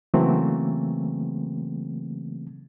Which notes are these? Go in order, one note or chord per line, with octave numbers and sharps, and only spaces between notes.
C#3 E3 F#3 A3 A#3 C4